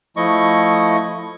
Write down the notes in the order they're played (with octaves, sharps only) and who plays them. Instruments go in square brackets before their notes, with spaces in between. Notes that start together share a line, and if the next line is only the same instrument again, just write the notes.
[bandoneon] F3 A3 E4 D#5 C#6